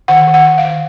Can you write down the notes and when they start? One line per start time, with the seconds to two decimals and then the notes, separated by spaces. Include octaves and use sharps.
0.08 D#3 F#5
0.27 D#3
0.34 F#5
0.46 D#3
0.58 F5
0.65 D#3